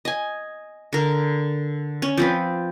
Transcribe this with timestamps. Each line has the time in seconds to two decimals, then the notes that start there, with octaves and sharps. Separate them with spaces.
0.05 D#5 G#5
0.93 D3 A#4
2.02 C#4
2.18 F3 C4 B4